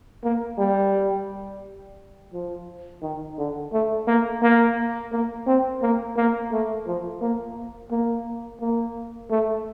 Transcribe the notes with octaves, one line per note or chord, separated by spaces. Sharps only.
A#3
G3
F3
D#3
D3
A3
A#3
A#3
A#3
C4
A#3
A#3
A3
F3
A#3
A#3
A#3
A3